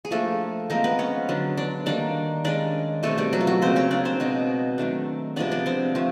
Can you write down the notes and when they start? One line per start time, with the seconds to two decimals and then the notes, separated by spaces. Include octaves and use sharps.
0.05 G#4
0.11 F3 A3 A#3 D4 A4
0.70 F3 G#3 A#3 C4 D#4 A#4
0.84 B3 B4
0.99 C#4 C#5
1.29 D3 F#3 B3 D4
1.57 D4 D5
1.86 D#3 G3 A#3 D4 D5
2.44 D#3 G#3 C#4 D4 D5
3.03 B2 G#3 A3 C4 A4
3.18 G3 G4
3.33 F#3 F#4
3.41 F4
3.47 F#3 F#4
3.62 C#3 F#3 A#3 C4 C5
3.76 C#4 C#5
3.91 D4 D5
4.05 C4 C5
4.20 B2 G#3 C4 D#4
4.78 D#3 F#3 A3 D4
5.36 C3 F3 G#3 B3 D4 D5
5.52 D4 D5
5.66 C4 C5
5.95 F3 A3 C4